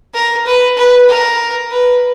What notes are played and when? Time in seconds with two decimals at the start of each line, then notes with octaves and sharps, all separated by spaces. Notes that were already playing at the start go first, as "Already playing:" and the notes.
0.14 A#4
0.46 B4
0.77 B4
1.08 A#4
1.71 B4